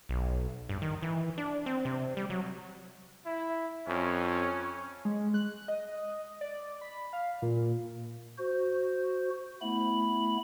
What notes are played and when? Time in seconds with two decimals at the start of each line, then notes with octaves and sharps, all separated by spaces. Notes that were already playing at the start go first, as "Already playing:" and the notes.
0.09 B1
0.69 G2
0.82 D#3
1.02 E3
1.38 D4
1.66 C4
1.85 C3
2.17 G3
2.30 F#3
3.26 E4
3.88 F2 C#4
5.05 G#3
5.34 F#6
5.68 D#5
6.41 D5
6.81 B5
7.13 F5
7.42 A#2
8.38 F#4 C5
9.61 A3 B3 E4 B5